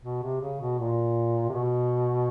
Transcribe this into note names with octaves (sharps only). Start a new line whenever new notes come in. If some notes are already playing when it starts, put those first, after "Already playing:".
B2
C3
C#3
B2
A#2
C3
B2